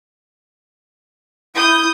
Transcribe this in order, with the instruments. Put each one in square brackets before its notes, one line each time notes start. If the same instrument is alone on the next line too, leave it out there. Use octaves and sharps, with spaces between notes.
[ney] E4 [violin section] D#6 G6